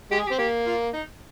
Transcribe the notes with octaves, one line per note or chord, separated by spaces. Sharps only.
G#3 G4
G#4
G4
C4
A#3 G4
F4
D#4